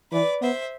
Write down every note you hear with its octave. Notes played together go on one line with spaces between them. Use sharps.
E3 B4 D5
B3 C5 E5